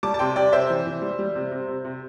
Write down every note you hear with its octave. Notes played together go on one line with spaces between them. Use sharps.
G3 A5 D6
A5
C3 G5 C6
C3 D5 G5
C3 C5 E5
E3
E3
G3
G3
C3
C3
C3
C3